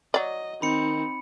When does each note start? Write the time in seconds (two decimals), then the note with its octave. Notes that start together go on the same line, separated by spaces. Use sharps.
0.14 F#3 D5 D#5
0.62 D#3 C4 D#4 B5 C#7